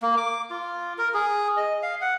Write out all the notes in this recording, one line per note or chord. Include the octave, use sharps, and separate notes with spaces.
A#3
D6
F4
A#4
G#4
D#5
F5
F#5